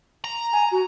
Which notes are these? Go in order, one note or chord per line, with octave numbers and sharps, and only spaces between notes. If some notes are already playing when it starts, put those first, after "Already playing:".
A#5
G#5
F#4